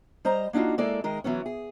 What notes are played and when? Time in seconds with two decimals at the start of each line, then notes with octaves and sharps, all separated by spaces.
0.25 G3 C5 D#5 A#5
0.53 A#3 D4 D#4 F4 F#4
0.78 G#3 A#3 E4 A4 D5
1.04 D#3 G#3 A#4
1.24 E3 F#3 B3 C#4
1.46 G#4